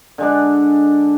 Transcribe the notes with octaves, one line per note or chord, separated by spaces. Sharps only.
D3 G#3 D4